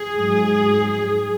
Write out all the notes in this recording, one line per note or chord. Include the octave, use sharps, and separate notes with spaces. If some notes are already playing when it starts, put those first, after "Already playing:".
Already playing: G#4
G#2 F#3